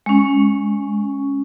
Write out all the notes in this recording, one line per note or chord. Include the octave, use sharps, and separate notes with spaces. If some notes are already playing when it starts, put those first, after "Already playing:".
G#3 C#4